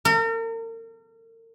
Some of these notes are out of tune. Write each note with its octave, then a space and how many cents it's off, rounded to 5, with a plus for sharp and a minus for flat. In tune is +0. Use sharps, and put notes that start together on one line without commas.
A#4 -40